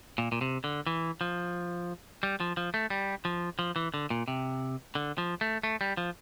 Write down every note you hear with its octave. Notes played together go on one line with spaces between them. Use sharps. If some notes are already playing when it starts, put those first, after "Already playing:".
A#2
A#2
C3
D3
E3
F3
G3
F3
F3
A3
G3
F3
F3
E3
D3
A#2
C3
D3
F3
A3
A3
G3
F3